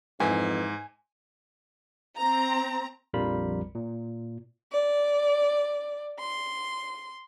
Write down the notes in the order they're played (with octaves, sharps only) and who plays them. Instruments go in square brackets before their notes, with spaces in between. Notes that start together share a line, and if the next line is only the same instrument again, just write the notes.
[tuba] F2 [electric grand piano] G#2 [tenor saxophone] E3 [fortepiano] G#5
[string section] C4 A#5
[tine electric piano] A#1 F2 G3 F4 A#4 B5
A#2
[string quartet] D5
C6